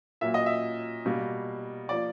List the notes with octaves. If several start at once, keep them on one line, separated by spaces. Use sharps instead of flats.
A#2 F#3 A#3 E5
D#5
E5
B2 G3 A#3
F3 A#3 D5